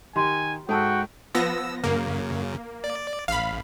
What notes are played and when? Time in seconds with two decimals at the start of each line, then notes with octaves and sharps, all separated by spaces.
0.16 D#3 G4 G#5 C6
0.69 G#2 F#4 A4 G5 A5 E6
1.35 F3 B3 E6 A#6
1.84 F#2 C#3 A#3
2.84 D5
3.28 A1 F5 B5